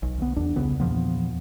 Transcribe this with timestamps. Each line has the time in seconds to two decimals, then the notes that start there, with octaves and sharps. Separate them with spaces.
0.03 B1
0.18 D2 B3
0.36 E2 D4
0.56 C2 C#3 B3
0.80 E2 A#2 F3 B3